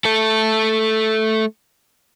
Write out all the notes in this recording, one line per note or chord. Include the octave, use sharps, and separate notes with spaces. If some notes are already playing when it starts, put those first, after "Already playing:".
A3 A4